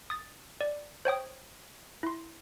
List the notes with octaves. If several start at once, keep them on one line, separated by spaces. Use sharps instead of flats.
D#6 A6
D5
C5 C#5 G5 D#6
E4 C6